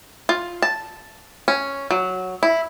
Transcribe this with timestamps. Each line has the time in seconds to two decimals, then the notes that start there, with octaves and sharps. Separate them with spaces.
0.29 F4
0.62 A5
1.48 C#4
1.91 F#3
2.43 E4